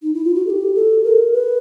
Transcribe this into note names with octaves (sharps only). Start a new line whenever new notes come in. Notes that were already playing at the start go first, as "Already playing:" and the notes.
D#4
E4
F4
F#4
A4
G4
A4
A#4
B4